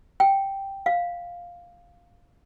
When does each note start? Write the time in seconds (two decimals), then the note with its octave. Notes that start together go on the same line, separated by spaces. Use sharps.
0.20 G5
0.86 F5